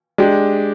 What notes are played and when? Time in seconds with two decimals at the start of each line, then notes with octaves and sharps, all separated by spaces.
0.18 G#3 D4 G4